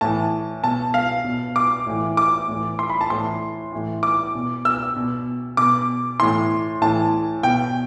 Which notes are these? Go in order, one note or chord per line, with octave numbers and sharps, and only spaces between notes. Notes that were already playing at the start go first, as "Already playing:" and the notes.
A2 E3 A5
B2 A5
F5
B2
D6
A2 E3
D6
A2 E3
C6
B5
A5
A2 E3 C6
A2 E3
D6
B2
E6
B2
B2 D6
A2 E3 C6
A2 E3 A5
B2 G5